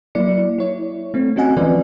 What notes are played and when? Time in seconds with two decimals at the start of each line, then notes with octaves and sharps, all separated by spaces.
0.15 F#3 A#3 E4 D5 C#7
0.58 E4 C#5
1.14 A3 C4
1.36 C4 C#4 F#4 D#5 F#5 G#5
1.57 E3 F3 C4 F4 B4 D5